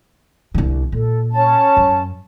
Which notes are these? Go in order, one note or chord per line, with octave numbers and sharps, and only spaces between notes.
C2 D3
A#2 A4
C#4 A5
F#2